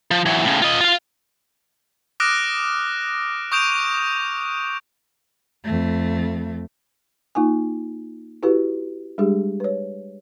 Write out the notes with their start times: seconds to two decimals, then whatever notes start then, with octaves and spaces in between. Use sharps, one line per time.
0.11 F3
0.26 E3 F#3
0.44 A2 C#3
0.62 F4 D#5
0.81 F4 F5
2.20 D6 D#6 F6 F#6 A#6 D7
3.52 C#6 D#6 G6 D7 E7 F7
5.64 F2 A3
7.35 A#3 D#4 F4 G#5
8.43 E4 F#4 G4 A4 B4
9.18 G3 G#3 D4 G4 G#4
9.60 B4 C#5